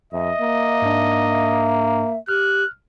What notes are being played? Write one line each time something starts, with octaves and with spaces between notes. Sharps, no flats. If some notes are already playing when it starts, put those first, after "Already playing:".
F2 D#5 E5
A#3
G#2 D4
E5
G4 F6 F#6